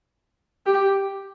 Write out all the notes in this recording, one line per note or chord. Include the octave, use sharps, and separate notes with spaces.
G4